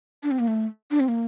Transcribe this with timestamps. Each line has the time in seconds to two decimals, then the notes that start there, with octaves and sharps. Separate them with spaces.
0.23 D4
0.31 C4
0.39 A#3
0.48 A3
0.91 D4
1.00 C4
1.08 A#3